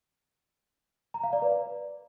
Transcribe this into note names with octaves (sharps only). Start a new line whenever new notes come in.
A#5
F5
D5
B4